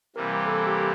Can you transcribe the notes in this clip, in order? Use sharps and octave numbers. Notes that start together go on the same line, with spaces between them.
C3 E3 G3 A#3 A#4
A4
G4
A4